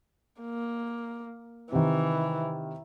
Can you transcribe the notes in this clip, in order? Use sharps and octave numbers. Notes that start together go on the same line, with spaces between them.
A#3
C3 D#3 E3